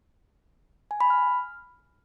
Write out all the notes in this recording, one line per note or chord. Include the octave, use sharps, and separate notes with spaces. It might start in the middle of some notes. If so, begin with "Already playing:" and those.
G#5
B5
F6